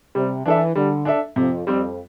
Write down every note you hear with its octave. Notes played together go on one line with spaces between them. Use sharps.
C3 G3
E3 D4 A4 E5
D3 G3
D4 A4 E5
F2 C3
F2 G3 C4